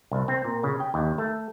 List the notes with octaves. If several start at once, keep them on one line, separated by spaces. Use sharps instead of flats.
C2
C4
A#2
C#3
G5
D#2
A3